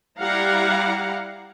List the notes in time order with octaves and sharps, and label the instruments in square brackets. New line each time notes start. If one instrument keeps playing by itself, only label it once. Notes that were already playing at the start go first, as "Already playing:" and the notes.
[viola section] G3 E4 G4 F5 F#5 A#5